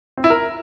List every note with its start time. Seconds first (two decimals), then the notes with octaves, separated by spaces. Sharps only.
0.17 C4
0.24 E4
0.30 A#4